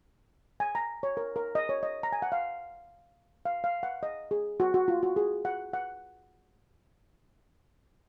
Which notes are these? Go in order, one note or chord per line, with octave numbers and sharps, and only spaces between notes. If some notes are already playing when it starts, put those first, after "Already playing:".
G#5
A#5
C#5
A#4
A#4
D#5
C#5
D#5
A#5
G#5
F#5
F5
F5
F5
F#5
D#5
G#4
F#4
F#4
F4
F#4
G#4
F#5
F#5